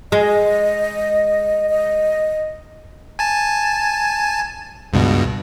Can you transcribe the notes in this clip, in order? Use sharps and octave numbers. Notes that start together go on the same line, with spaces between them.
G#3 D#5
D#5
G#5 A5
C#2 G2 B2